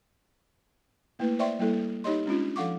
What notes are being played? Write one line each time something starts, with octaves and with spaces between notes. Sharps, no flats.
A3 A#3 E4 B4
C5 D5 E5 G5 C6 C#6
G3 A#3 E4 A4
D#4 G4 C#5 D#5 C6
G#3 C#4 D4 F4
F3 A4 F5 F#5 C#6 D6